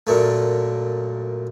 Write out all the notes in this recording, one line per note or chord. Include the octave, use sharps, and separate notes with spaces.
F#2 A#2 A3